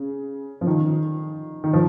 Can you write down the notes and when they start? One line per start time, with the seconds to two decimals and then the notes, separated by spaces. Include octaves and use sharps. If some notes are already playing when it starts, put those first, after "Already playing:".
Already playing: C#3
0.61 F3
0.67 D#3
1.64 D#3
1.73 F3